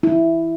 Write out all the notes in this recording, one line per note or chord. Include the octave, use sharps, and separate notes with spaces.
E4